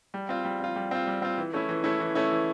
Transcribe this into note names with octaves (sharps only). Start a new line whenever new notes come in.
G3
C4 F4
G3
C4 F4
G3
C4 F4
G3
C4 F4
E3
A3 C#4 E4
E3
A3 C#4 E4
E3
A3 C#4 E4
E3